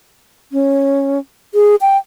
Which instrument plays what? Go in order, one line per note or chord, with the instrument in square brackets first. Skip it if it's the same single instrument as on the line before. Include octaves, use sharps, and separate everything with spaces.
[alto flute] C#4
G#4
G5